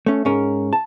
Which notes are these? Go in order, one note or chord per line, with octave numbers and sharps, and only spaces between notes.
A3 C#4
G#2 C#4 A#4
A5